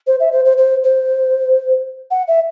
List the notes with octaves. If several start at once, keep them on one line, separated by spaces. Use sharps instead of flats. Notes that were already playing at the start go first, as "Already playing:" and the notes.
C5
E5
C5
C5
C5
C5
F#5
E5